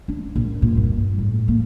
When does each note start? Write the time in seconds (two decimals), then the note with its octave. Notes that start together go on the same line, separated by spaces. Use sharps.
0.08 D4
0.35 A#1
0.62 A#2
0.77 G2
1.18 A2
1.48 A#3